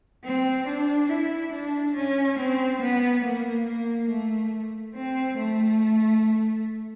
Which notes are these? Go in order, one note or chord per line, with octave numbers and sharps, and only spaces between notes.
C4
D4
E4
D4
C#4
C4
B3
A#3
A#3
A3
C4
A3